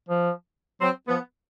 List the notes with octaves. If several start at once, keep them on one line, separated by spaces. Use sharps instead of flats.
F3
F#3 C4
F3 B3